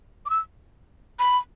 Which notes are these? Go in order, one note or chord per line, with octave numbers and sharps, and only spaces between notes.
D6
E6
B5